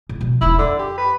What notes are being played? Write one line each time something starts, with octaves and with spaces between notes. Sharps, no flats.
C#3
B2 F3
E1 D#4 E4
F2 D3
G4
B4